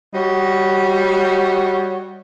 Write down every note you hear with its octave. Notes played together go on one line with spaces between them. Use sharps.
G3 F#4 C#5 D#5